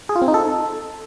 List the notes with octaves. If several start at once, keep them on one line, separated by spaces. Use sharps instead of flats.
G#4
F4
C4
D#4
A4